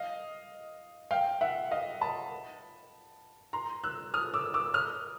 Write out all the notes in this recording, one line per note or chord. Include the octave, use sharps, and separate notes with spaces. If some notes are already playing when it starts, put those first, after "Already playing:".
Already playing: D#5 F5
F5 G5
E5 F#5
D#5 F5
A5 B5
A#5 C6
E6 F#6
D#6 F6
D6 E6
D6 E6
D#6 F6